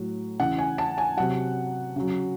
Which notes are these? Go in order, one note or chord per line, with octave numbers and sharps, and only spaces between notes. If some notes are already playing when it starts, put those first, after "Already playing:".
Already playing: A2 F#3
C#3 E3 F#5
G#5
A5
G#5
C3 F#3 F#5
C#3 F#3